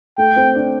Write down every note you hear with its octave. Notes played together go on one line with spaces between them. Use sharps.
A3 G5
C4
D4